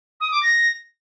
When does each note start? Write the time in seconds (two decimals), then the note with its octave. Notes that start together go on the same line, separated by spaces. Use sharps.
0.20 D#6
0.31 D6
0.43 A#6